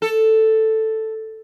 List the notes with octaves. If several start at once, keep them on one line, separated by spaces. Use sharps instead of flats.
A4